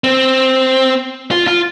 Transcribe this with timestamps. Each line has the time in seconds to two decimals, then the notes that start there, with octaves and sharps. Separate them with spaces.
0.04 C4
1.31 F4
1.47 F4